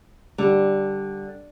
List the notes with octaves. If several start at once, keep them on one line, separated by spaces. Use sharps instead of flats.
D3 G3